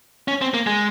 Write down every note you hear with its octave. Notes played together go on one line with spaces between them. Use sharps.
C#4
C4
A#3
G#3